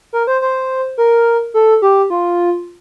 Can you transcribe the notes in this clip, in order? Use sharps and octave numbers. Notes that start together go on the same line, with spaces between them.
A#4
C5
C5
A#4
A4
G4
F4